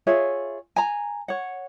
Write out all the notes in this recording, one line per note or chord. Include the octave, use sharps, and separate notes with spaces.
F4 G#4 C#5 E5
G#5 A#5
C#5 F#5